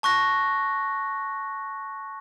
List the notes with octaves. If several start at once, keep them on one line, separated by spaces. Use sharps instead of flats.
A5 C#6 F#6 A#6